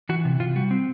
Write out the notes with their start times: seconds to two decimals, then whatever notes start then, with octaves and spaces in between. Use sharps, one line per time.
0.09 E3 F#4
0.25 C3
0.40 C3 F4
0.56 G3 F#4
0.71 C4